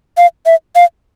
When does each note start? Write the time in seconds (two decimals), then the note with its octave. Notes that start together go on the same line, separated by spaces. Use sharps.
0.18 F5
0.46 E5
0.76 F5